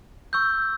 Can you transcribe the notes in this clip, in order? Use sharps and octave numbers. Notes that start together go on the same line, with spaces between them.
C#6 E6 G6